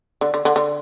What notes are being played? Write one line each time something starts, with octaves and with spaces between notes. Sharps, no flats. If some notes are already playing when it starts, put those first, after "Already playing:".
D3
D3
D3
D3